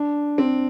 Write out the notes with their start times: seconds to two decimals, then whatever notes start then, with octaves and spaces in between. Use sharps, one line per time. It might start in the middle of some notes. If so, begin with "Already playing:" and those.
Already playing: D4
0.38 C4